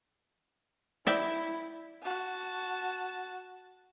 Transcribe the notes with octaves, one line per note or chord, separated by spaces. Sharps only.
E4 D5 E5 G5
F#4 A5